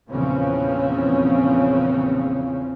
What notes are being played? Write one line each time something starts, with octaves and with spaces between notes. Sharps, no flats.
A#1 E2 C#3 F3 C4 C#4